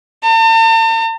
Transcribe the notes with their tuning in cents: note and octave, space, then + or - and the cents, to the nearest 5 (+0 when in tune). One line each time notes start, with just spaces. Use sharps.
A5 +45